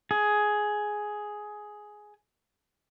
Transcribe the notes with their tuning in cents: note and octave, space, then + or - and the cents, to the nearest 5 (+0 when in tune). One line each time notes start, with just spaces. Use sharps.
G#4 +10